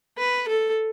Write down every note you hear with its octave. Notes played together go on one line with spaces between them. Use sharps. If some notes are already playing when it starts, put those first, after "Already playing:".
B4
A4